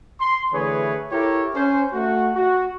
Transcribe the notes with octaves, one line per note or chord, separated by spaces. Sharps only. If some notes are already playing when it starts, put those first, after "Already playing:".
C6
D3 E3 A3 G#4 B4 C#5
E4 G4 A4 A#4 C#5
C#4 C5
A3 F#4
F#4